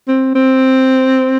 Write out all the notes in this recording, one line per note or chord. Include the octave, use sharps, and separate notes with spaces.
C4
C4